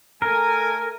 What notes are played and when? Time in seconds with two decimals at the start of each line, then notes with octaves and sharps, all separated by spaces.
0.22 A3 A4 A#4 G#5